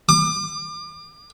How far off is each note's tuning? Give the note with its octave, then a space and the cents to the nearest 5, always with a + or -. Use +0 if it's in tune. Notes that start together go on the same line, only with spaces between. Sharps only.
D6 +35